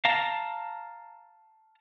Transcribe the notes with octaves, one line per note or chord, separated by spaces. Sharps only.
F5 A5 A#5